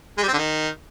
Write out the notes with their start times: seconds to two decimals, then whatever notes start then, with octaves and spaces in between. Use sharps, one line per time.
0.18 G#3
0.23 G3
0.28 C4
0.33 D3
0.38 D#3